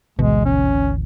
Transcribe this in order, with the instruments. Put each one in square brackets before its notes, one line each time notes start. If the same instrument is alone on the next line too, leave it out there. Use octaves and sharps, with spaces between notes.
[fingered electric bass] G#1 D2 E3 [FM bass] B2 [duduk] G#3
[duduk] C#4